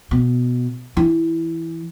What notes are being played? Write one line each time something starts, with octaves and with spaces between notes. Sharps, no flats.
B2
E3